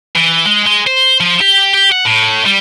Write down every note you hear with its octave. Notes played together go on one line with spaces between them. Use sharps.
E3
G#3
G#3
C5
F3
G4
G4
F#5
A2
G3